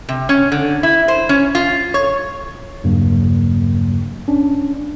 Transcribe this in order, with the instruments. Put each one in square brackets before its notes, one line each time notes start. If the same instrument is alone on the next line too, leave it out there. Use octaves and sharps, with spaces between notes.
[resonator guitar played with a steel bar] C3
C#4
D3
E4
C5
C#4
F4
C#5
[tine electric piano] E2 G2 C#3 F#3 A#3
C#4 D4